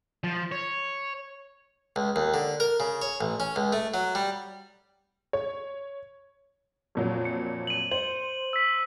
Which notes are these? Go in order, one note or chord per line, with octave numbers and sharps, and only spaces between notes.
F3
C#5
C#2
D#2
D3
A#4
C#3
C#5
A1
C#4
C#2
A3
F#3
G3
C#5
F2 A#2 F#3
C#7
D#7 F#7
C5 F#7
E6 B6